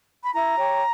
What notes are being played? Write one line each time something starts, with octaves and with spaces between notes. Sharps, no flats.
B5
E4 A#5
G4 C#5